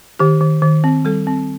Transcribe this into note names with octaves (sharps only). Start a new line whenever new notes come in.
D#3 G4
D#3
D#3
C4
G3 A4
C4